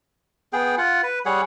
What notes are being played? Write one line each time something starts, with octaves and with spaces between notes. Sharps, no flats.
B3 G#4 G5
F4 F#5
B4
G3 G#4 C#5 F#5